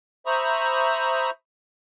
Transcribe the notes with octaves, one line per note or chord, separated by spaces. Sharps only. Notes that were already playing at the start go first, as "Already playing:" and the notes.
C5 E5 A#5 B5 C#6 D#6